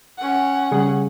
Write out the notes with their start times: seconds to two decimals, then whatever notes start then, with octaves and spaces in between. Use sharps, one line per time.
0.18 C#4 F#5
0.72 C#3 G3 G#4